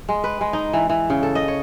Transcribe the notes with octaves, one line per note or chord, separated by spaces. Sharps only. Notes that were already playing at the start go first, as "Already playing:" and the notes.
G#3
B4
G#3
D#4
E3
E3
C#3
A4
D#5
C#5